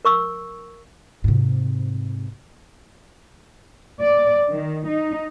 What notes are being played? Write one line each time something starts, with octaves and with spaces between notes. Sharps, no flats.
A#4 C#6 E6
G#2 C3
D5
D#3
D#4